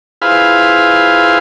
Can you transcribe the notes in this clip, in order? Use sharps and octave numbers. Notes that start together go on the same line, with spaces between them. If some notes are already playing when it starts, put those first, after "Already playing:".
E4 F4 G#4 B4 C5 F5